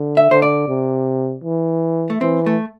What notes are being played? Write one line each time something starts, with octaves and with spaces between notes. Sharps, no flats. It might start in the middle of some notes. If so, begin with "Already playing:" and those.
Already playing: D3
E5
D3 C5
D5
C3
E3
A3
E3 C4
A3